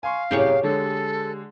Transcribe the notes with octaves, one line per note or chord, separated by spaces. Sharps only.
F5 G#5 C6 C#6
C2 F#2 A2 G4 G#4 C#5
D3 G#3 A4